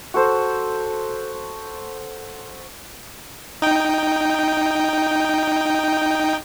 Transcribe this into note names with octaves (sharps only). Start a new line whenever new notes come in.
F#4 A4 C5
D#4 G5